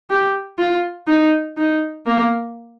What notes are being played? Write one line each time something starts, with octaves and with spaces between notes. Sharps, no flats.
G4
F4
D#4
D#4
A#3